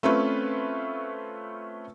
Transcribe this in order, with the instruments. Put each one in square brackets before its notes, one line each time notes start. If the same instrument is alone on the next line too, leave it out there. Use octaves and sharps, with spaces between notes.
[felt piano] A3 C4 C#4 F4 B4